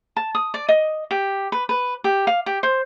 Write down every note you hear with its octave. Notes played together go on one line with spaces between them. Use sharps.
A5
D#6
D5
D#5
G4
B4
B4
G4
F5
G4
C5